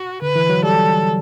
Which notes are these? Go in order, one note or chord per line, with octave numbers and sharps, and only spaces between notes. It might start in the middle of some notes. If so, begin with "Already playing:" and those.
Already playing: F#4
D3 B4
E3
F#3
G3 A4